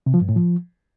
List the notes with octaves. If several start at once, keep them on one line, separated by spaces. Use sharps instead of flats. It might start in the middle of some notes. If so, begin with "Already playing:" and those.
C3
F3
G2
A2
F3